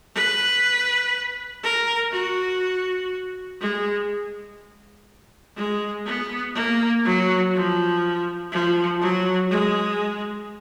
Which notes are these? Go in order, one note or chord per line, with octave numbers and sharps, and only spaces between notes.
B4
A#4
F#4
G#3
G#3
B3
A#3
F#3
F3
F3
F#3
G#3